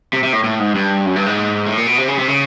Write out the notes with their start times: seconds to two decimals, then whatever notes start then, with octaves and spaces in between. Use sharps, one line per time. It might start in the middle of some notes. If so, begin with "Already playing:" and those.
0.13 C3
0.23 C3
0.33 A2
0.44 A2
0.60 G#2
0.75 G2
1.06 F#2
1.16 G2
1.26 G#2
1.67 A2
1.77 A#2
1.87 B2
1.98 C3
2.08 C#3
2.19 C3
2.28 C#3